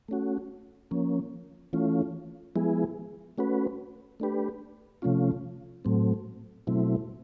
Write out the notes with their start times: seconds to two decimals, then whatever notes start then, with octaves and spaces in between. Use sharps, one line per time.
0.08 A3 C#4 F#4
0.91 F3 A#3 C#4
1.73 E3 A3 C#4 F4
2.56 F3 G#3 B3 E4 G#4
3.38 A3 C#4 F#4 B4
4.20 A3 D4 G4 B4
5.02 C3 F3 A3 C#4 F4
5.85 A2 F#3 A3 C4
6.67 B2 F#3 A3 C4 E4